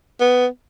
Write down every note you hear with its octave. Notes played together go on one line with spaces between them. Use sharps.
B3